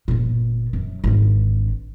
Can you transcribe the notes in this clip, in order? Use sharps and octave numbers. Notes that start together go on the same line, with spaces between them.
G1 A#2
F#2
G#1 D3